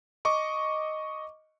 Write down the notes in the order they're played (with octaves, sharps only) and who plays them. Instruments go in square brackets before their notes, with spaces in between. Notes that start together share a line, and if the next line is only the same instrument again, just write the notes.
[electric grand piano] D#5 C#6 D6